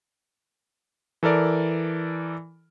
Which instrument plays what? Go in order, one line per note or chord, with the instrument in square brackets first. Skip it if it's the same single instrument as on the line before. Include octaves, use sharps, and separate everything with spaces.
[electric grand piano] E3 A4 A#4 D5